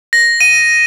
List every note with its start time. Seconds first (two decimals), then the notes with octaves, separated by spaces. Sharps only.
0.13 A#6
0.41 D#7